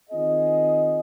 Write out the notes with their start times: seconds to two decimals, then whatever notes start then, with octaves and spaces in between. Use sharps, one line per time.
0.10 D#3 C4 F4 G#4 D#5